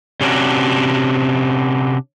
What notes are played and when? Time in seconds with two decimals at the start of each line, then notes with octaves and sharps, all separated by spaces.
0.21 C3 C#4 D4 F#4